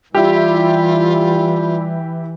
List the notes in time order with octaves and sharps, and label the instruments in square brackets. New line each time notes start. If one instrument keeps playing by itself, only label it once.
[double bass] E3 [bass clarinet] G3 [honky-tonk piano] E4 G4 [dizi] F4